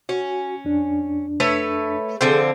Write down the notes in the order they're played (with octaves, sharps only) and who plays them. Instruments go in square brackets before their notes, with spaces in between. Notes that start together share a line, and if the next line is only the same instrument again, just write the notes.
[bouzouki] C#4 [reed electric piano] F#4
[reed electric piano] F2 D4
[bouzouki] A3 B4 C#5
[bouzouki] D3 F3 C4 [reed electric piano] G#4 A4 G6